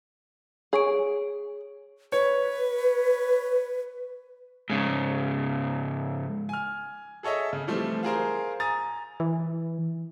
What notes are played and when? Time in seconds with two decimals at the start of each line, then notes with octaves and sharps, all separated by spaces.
0.73 G#4 C#5 C#6 D7
2.12 B4 C#5
4.70 G#2 C#3
6.49 G#5 F6
7.23 G#4 A4 C#5 D#5 E5
7.53 C#3
7.67 E3 F3 G3 A3 C4
8.03 F4 G#4 A#4 C5
8.60 G#5 A#5 D#6 A6
9.20 E3